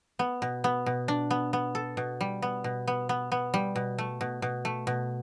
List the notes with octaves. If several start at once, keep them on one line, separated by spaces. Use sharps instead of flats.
B3
B2
B3
B2
D4
B3
B3
A4
B2
G3
B3
B2
B3
B3
B3
G3
B2
A3
B2
B2
A3
B2